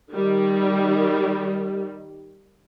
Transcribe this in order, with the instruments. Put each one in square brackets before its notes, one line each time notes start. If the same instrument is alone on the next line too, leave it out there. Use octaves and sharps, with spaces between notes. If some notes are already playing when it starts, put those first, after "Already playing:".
[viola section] D#3 G3